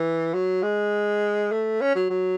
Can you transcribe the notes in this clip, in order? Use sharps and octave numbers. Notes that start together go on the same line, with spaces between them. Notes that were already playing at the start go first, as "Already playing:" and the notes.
Already playing: E3
F#3
G#3
A3
C#4
F#3
F#3